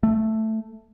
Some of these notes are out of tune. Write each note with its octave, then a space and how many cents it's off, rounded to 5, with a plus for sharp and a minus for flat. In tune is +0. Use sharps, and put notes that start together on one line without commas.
A3 +0